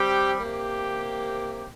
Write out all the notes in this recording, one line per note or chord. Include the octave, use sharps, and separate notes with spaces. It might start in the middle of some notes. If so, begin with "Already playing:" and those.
Already playing: G3 C4 G4
C3 A#3 G4